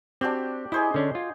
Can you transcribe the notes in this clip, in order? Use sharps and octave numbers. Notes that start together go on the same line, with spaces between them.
C4 D4 F#4 G4
E4 G#4 C5 D#5
D3 C#4 D4
F4